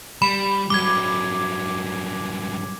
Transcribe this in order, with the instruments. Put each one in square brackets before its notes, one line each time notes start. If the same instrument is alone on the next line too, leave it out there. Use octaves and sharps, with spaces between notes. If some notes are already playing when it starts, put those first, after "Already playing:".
[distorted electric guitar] G3 [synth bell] B5
[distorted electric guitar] G2 F#3 [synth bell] D6 G#6